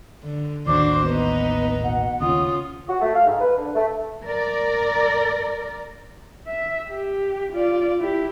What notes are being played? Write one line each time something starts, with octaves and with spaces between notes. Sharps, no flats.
D3
A1 D#2 D#3 D4 F#4 C5 D6
B3 D#4 B4
B2 F#5
D#2 C#3 C#4 F4 D#6
F#4
A3
F5
G#2
B4
D3
A3
A#4 D5
E5
G4
F4 D5
E4 G4